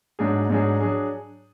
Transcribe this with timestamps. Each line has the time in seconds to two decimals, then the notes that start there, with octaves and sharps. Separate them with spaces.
0.19 G#2 F#3 D4 G#4
0.49 G#2 F#3 D4 G#4
0.80 F#3 D4 G#4